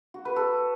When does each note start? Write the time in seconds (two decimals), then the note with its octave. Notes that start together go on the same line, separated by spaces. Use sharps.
0.14 F#4
0.25 B4
0.36 A4